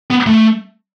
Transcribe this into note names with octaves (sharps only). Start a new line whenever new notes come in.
B3
A3